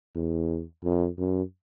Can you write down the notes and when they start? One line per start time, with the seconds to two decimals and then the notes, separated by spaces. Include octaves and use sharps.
0.15 E2
0.84 F2
1.18 F#2